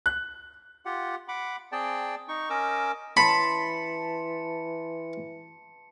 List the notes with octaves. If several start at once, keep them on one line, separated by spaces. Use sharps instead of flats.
F#6
F4 G4 F#5
F#5 B5 D6
C4 G#4 D5 G5 A5
D#4 C#6
C#4 A#4 D#5 D6 E6
E3 A5 B5 C6 C#7